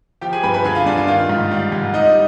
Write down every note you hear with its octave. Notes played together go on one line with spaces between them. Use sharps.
F3 G4 G5
G#4 G#5
G2 B4 B5
B4 B5
D3 G#4 G#5
F4 F5
G2 D5
F4 F5
D#3 F4 F5
G#2
G3
G#2
G3 D#4 D#5